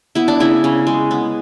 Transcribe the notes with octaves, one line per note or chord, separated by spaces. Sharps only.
B3 E4
D4
C#3 E4
C#3
G#3
B3